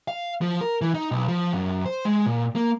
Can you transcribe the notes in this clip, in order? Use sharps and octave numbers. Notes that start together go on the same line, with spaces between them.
F5
F3
A#4
E3
D#4
B1
F3
F#2
C5
G#3
A#2
A#3